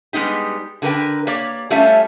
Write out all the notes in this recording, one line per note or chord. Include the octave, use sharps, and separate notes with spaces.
G3 G#3 B3 D#4 G4
D3 F#4 A#4 B4 G5
A#3 G4 C#5 D5
G3 A3 C#4 F4 A4 E5